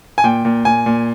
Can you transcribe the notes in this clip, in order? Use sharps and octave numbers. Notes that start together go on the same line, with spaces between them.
G#5
A#2 G5
A#2
A#2 G#5
A#2